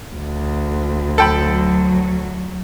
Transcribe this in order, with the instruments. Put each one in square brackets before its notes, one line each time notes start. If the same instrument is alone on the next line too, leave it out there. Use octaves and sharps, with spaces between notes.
[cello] D2
[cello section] F#3 [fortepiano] A4 G5 B5